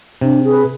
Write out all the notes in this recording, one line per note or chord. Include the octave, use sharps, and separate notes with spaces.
C3 D4
G#4 B4